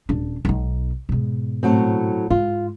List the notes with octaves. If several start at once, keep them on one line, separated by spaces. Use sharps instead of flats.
D#1 D4
B1 D#4
G#2 B2
A2 F#3 C4
G#2 F4